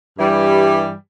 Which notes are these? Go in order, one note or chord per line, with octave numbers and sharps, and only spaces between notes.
G2 E3 G3